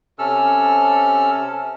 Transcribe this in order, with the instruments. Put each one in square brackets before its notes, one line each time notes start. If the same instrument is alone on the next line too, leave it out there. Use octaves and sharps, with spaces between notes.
[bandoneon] C3 C#4 A4 E6 F6